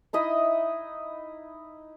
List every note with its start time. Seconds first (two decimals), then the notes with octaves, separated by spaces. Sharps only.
0.13 D#4 E4 D#5 B5